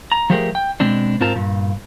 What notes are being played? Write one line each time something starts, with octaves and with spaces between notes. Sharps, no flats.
A#5
F3 A3 G4 G#4 A#4
G5
B2 G#3 C4 D4
G#2 C4 F4 A#4 A5
G2 A#2